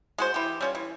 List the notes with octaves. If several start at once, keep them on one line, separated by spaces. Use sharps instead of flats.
G#3 F#4 C5
E3 G4
G3 C#4 F4
E3